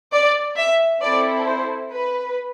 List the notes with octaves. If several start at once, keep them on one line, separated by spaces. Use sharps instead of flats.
D5
E5
C4 E4 A4 D5
C5
B4